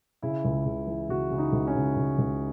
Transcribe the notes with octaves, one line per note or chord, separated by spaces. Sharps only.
C#3 E4
C#2
C#3
E3
C#3 F#4
C#3 E4
D#4
C#2
C#4
C#3
C#2
C#2